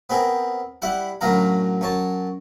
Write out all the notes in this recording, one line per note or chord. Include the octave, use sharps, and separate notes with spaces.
B3 C4 G#4 A#4
G3 E4 F#5
F#2 A2 D3 F#3 F5 A#5
F#2 C#5 A5